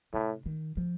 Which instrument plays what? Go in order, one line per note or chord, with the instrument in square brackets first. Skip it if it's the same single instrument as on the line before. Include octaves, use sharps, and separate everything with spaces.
[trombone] A2 [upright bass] C3
[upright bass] D#3
F3